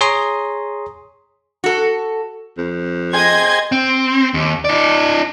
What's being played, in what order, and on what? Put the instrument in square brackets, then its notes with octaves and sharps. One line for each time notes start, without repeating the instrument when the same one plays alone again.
[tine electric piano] G#4 C#5 A#5 C6 D#6
[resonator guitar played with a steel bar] F#4 A4
[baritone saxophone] F2
[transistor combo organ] G#4 C5 G5 [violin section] D#5 G#6
[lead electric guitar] C4
D#2
D#4 D5